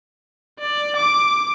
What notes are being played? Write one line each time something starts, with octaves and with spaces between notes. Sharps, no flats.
D5
D6